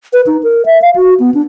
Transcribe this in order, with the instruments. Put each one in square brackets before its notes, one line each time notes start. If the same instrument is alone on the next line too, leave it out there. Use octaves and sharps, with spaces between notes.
[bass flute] B4
D#4
A#4
E5
F5
F#4
B3
D4